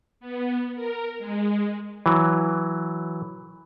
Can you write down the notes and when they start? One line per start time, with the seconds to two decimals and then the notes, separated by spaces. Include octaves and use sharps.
0.20 B3
0.75 A#4
1.19 G#3
2.06 E3 F#3